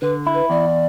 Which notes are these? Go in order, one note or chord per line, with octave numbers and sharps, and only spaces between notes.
D3 B4
E4
B4
E2 D5